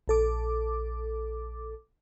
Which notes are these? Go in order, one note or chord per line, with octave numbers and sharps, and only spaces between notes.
A#1 A4 D6